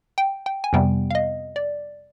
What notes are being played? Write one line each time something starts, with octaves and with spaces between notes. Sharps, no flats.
G5
G5
G#5
F2 C3 G3 B3 G5
F5
D#5
D5